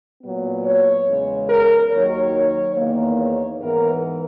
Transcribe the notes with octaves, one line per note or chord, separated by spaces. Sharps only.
A#2 F#3 B3
C#5
E2 C#3 G#3
A#4
D#2 D#3 F#3 C#5
E2 D#3 A#3
C#5
G#2 E3 B3 A#4